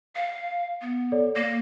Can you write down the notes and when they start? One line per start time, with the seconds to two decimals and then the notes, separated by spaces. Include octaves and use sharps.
0.15 F5
0.82 B3
1.12 A4 C#5 D5
1.36 A#3 A#6